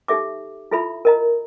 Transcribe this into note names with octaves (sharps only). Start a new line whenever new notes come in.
D#4 G4 A4 E5 D6
E4 F4 A4 E5 B5
A#4 D#5 A#5